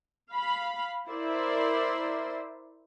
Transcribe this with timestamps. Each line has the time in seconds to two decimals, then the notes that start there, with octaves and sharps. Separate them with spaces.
0.30 F5 B5
1.08 E4 A#4 C5 D5 E5